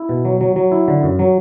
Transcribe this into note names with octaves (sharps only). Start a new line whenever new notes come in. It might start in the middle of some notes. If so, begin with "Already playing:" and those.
Already playing: E4
B2
F#3
F#3
F#3
E4
D3
F#2
F#3